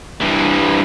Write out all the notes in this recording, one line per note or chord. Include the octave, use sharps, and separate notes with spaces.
G2 E3